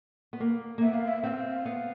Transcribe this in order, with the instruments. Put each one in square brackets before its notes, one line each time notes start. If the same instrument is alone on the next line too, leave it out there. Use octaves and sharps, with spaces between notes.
[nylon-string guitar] B3
A#3
A#3
[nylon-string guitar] B3 [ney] E5
[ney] F5
E5
[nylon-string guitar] C4 [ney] G5
[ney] F5
[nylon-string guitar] B3